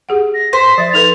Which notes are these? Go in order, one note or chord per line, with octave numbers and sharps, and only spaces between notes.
G4 G#4 F#5
A#6
C5 B6
F3 E5 A6
D#4 A4 B4 F7